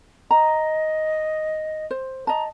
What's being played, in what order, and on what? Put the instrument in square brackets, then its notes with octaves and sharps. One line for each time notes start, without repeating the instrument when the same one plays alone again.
[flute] D#5 [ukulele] A#5
[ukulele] C5
[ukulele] D#5 A5 [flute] A#5